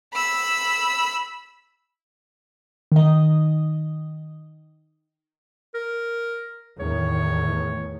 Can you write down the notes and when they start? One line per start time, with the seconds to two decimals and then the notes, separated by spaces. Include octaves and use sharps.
0.14 B5 E6
2.92 D#3 D#5
5.74 A#4
6.80 E2 A2 D#3 C#5